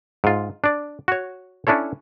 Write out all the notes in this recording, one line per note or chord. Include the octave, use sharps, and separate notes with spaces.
G#2 F4
D4 D5
F#4 C#5
C#4 D4 E4 A4 C#5